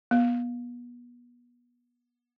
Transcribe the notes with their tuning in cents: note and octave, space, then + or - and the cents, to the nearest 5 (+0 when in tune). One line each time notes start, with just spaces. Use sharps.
B3 -30